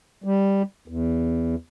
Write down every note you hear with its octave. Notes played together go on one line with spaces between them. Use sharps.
G3
E2